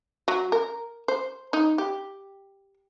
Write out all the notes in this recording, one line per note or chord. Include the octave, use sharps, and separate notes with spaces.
F#3
A#4
C5
D#4
G4